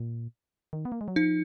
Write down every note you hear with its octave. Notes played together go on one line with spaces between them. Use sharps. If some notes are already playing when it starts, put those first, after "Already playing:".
Already playing: A#2
D#3
B3
A#3
G#3
F#3
F3 D#4